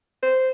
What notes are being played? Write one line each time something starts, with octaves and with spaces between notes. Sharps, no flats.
C5